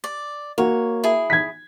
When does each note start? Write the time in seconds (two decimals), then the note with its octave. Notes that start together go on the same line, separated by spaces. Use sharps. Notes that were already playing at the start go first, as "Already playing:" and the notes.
0.04 D5
0.58 A#3 F#4 C#5
1.04 E4 G#4
1.30 G#6 B6